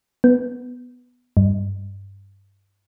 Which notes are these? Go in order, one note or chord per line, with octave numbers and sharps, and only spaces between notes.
B3
G2